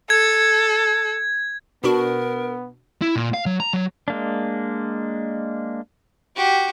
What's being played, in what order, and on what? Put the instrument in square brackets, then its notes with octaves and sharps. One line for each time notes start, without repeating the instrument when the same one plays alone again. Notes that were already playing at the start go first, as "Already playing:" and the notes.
[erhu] A4 [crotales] G#6
[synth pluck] B2 D4 F#4 [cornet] B3 [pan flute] A#4
[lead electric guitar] E4
A#2
F5
F#3
A#5
F#3
[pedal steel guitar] G#3 A#3 D4
[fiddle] F#4 G4